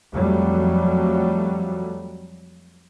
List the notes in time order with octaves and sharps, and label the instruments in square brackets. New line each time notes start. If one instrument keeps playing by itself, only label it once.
[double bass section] F2 F#3 G3 A3